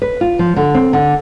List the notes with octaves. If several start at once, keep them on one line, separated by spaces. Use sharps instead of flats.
B4
F4
F3
D3
C4
D3